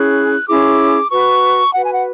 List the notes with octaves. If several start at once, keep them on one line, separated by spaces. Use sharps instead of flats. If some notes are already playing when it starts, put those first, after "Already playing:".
Already playing: C#4 E4 G#4 F#6
C#4 E4 G#4 D6
F#4 B4 C#6
F#4 B4 F#5
G#5
F#5